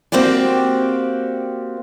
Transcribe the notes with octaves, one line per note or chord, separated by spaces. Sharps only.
A#3 C4 F#4 G4 D5